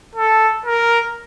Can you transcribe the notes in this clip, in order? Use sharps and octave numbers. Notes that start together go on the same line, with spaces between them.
A4
A#4